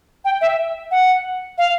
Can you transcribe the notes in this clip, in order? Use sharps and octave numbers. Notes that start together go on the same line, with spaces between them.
G5
E5
F#5
F5